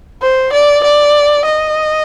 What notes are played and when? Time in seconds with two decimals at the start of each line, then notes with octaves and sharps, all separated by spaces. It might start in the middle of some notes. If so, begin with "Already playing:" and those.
0.22 C5
0.53 D5
0.84 D5
1.45 D#5